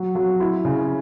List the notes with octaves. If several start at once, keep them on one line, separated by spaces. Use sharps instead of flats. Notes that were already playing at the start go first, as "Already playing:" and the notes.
Already playing: F#3
F#3
E4
C#3